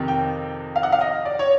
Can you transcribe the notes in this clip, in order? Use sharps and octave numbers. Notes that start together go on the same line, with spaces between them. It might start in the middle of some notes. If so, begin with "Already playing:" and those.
Already playing: F2 C3 D#3
G5
F5
F#5
F5
D#5
D5
C#5